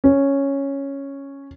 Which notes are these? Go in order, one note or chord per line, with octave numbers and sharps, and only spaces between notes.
C#4